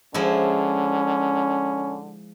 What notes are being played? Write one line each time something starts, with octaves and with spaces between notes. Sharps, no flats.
D3 F3 G#3 C#4 E4